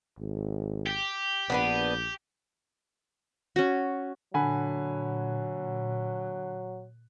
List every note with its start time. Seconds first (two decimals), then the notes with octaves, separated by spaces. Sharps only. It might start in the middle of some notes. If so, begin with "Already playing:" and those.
0.19 G#1
0.86 G4
1.50 A#1 B3 D4 B4
3.56 C#4 F#4
4.34 A#2 D3 F#3 F#5 G#5 B5